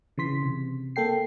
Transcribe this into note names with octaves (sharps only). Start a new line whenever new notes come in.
C#3 E3 C6 B6
C3
A#3 A4 G5 C7